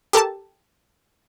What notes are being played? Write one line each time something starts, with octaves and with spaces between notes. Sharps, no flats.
G4 A4 A#4 A5